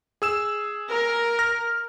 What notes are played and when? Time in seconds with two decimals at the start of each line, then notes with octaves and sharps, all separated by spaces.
0.22 G#4 E6 E7
0.89 A#4
1.39 F6 A#6